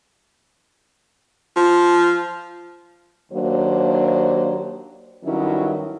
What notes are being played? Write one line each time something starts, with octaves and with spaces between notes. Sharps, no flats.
F3
D#2 F#3 A#3 D4 C5
G2 D#3 F#3 C#4 E4